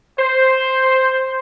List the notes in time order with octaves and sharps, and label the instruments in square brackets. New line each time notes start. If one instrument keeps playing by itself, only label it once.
[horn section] C5